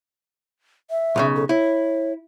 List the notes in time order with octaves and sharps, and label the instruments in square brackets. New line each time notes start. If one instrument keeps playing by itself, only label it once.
[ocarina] E5
[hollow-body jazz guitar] B1 A2 C#3
[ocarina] A4
[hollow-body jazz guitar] E4 [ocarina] C#5